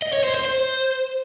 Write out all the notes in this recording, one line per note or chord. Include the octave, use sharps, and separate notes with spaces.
D#5
C#5
C5
C5
C5